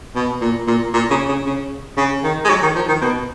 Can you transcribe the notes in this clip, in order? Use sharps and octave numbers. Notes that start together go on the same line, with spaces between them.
B2
A#2
A#2
A#2
C#3
C#3
C#3
C#3
D#3
G#3
F#3
D#3
F3
D#3
B2